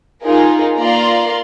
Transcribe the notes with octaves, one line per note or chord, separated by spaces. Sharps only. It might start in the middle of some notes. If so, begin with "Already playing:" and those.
D#4 F4 G#4 A#4
A#3 F4 D5 A#5 C6